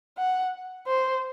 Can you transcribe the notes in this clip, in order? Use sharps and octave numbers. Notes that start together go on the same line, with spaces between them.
F#5
C5